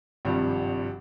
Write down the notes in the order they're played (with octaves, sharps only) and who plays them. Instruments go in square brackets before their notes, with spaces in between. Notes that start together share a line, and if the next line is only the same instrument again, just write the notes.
[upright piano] G#1 G2 C3 F3 G3